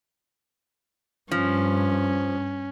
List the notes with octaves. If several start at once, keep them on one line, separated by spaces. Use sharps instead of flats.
G2 F3 C#4